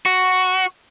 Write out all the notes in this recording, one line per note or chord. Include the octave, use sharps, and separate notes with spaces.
F#4